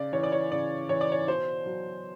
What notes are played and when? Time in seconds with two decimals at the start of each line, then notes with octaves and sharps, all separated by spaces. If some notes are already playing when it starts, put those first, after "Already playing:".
Already playing: C#3 D5
0.13 E3 C#5
0.23 D5
0.32 C#5
0.52 C#3 D5
0.89 E3 C#5
1.01 D5
1.12 C#5
1.28 B2 C5
1.66 F#3